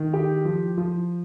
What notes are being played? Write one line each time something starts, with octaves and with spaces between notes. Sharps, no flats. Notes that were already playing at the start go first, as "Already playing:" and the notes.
Already playing: D#3
G4
F3
F3